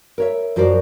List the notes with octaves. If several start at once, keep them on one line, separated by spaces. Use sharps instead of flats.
A#4 C#5 E5
F#2 F3 F#4 A#4 C5 D5